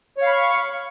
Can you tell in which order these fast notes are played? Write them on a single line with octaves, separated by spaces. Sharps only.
C#5 F5 B5 C#6